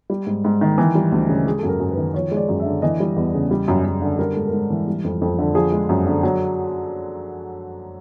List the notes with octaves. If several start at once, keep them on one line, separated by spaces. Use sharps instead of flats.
G3
G#2
G#2
D#3
E3
G3
D2
C#3
G#3 G#4
F#2 A4
A#4
F#2
B4
D#3
F3 C#5
G#3 C#5
D5
F#2
E5
D3
E3 D#5
G3
E2
C#3
G3
F#2
F#2
D3
G3 A#4
G#2 A4
A#4
G#2
E3
G3
F2
F2
D3
F3 G#4
G#3
F#2
D3
F#3